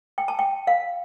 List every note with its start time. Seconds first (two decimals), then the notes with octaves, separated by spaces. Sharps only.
0.18 G5
0.28 A5
0.39 G5
0.67 F5